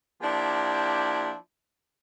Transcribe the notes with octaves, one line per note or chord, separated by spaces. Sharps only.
F3 A#3 D4 E4 G4